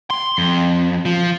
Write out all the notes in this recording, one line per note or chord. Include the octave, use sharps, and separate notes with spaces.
C6
F2
F3